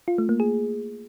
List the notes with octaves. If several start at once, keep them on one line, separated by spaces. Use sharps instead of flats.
F4
A3
A#3
G#4